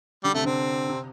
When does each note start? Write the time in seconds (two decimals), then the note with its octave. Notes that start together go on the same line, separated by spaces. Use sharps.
0.24 D3 G3
0.34 C3 A3
0.44 D3 C4
0.90 C3